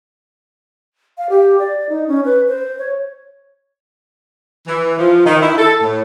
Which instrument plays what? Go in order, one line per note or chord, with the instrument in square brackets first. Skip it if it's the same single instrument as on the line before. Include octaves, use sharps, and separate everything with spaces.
[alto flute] F5
G4
D5
D#4
C#4
B4
C5
C#5
[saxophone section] E3
F3
D#3
E4
A4
A2